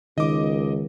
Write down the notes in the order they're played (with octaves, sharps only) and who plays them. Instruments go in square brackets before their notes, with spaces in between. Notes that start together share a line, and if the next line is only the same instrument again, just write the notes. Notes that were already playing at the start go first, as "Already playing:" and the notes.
[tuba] C#2 [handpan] D#3 [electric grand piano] D#5 D6